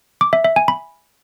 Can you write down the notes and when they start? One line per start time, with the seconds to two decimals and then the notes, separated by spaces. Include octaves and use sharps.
0.21 D6
0.33 E5
0.45 E5
0.56 G#5
0.68 B5